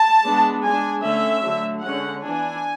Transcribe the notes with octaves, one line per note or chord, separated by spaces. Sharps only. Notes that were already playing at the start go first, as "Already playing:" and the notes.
Already playing: A5
G#3 B3 D4
G#3 D4 G#5
D3 A3 C#4 E5
D3 F#3 A3
D3 G#3 C#4 F#5
E3 B3 D4 G#5